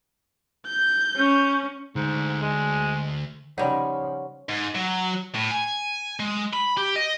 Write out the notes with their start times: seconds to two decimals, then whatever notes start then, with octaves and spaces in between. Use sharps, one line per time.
0.68 G6
1.16 C#4
1.96 D2 G#2
2.42 G#3
3.58 C#3 F3 G3 D#4 C#5 F#5
4.49 G#2
4.75 F#3
5.35 A2
5.51 G#5
6.20 G#3
6.53 B5
6.78 G4
6.96 D#5